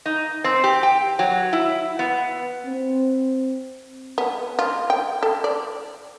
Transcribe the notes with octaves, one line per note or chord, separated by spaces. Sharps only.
D#4
C4
G4
G5
F#3
E4
B3
C4
B3
F4
G5
A4
D5